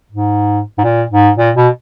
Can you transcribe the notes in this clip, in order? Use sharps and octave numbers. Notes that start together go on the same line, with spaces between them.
G#2
G#2
A#2
G#2
A#2
B2